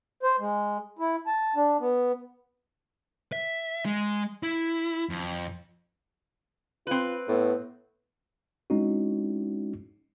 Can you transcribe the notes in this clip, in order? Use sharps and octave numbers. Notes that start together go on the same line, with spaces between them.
C5
G#3
E4
A5
D4
B3
E5
G#3
E4
F2
C4 F4 B4
A2 B3
G#3 C4 C#4 D#4 E4 F#4